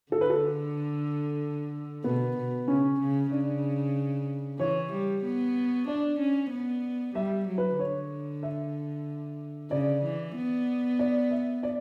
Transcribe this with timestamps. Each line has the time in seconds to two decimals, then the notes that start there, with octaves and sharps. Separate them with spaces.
0.12 D3 A4
0.21 B4
0.30 A4
2.04 B2 B3
2.36 B2
2.68 C#3 C#4
3.00 C#3
3.31 C#3 D4
4.59 E3 C#5
4.92 G3
5.23 B3
5.87 D4 D5
6.19 C#4
6.51 B3
7.15 G3 E5
7.47 F#3
7.58 B4
7.79 D3 C#5
8.43 E5
9.71 C#3 D5
10.04 E3
10.36 B3
10.99 D5
11.31 E5
11.63 D5